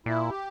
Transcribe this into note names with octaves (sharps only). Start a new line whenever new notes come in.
A#2 E4
G4